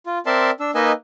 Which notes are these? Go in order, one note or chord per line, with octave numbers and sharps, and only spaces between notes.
F4
C4 A#4 D5 E5 A5 C6
D4 E6
A#3 D#4 B4 D#5 G#5 E6